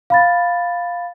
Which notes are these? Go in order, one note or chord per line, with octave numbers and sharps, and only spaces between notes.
F5 B5 A6